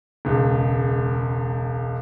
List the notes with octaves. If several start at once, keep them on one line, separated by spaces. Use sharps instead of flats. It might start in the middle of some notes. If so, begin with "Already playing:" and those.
E1 C#2